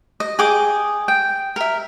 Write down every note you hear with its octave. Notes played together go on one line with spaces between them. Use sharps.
D#5
G#4 G5 D6 D#6
G5
A#4 E5